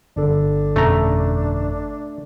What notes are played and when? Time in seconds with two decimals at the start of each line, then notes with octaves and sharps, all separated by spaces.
0.17 G1 D4 A4
0.76 F2 B2 A3 C#4 A#5